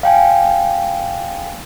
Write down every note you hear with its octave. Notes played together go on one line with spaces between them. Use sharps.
F5 G5 G#5